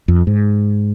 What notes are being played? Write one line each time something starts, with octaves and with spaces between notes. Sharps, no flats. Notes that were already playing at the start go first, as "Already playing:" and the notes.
F2
G#2